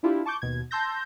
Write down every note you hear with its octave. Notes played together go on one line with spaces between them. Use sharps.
D4 E4 F4 G4
A5 C#6 D6 G6
D#2 B2 G#6
A5 C6 E6 G6 A#6